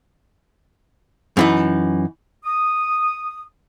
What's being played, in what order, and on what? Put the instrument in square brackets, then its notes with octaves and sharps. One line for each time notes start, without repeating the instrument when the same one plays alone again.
[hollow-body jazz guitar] F#2 E3 D#4
[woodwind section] D#6